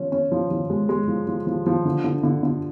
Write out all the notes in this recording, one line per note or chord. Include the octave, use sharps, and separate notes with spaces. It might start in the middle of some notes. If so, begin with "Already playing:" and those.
Already playing: F3 C#4
C#4
F3
F3
G#3
G#3
F3
F3
F3
F3
D3
D3
D3
D3